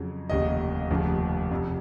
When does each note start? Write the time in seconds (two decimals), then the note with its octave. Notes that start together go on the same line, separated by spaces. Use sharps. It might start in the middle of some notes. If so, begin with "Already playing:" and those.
Already playing: F2 C#3 F#3
0.29 F1 D#2 C#3 D#5
0.90 F1 D#2 C#3 F3
1.51 F1 F2 C3